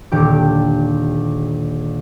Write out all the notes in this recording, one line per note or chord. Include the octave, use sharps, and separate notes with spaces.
D#1 D3 G4 D6